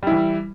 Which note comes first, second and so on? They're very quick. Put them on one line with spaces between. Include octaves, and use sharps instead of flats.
G3 E4 E3